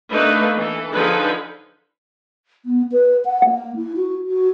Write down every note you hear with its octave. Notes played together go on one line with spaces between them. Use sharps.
A3 A#3 D4 D#4 A4 B4
E3 A4
D3 F3 D#4 G#4 A4 B4
B3
B4
F#5
A#3
E4
F#4
F#4